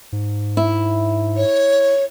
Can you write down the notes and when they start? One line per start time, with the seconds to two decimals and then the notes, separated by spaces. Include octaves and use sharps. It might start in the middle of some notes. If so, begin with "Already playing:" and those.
0.12 G#2
0.57 E4
1.36 C#5